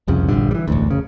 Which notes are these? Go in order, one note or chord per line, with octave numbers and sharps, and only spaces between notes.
F1 C2 F2 C#3
D#1 A#1 G2 D3
E3 G3
E1 A1 D2
F#1 C#3